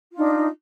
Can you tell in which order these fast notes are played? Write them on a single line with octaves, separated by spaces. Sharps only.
F4 D4 D#4